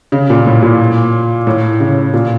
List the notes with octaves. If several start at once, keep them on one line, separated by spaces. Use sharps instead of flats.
C#3
A#2
A2
A#2
A2
C#3
A#2